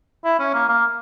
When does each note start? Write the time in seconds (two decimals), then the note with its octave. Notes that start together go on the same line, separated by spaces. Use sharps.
0.24 E4
0.39 C#4
0.54 A#3
0.69 A#3